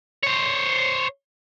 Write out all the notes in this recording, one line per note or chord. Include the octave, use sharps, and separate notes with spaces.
C5 C#5